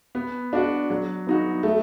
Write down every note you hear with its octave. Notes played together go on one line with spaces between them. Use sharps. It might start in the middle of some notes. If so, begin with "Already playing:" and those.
B3
D4 F#4
F#3
B3 D#4 F#4
A3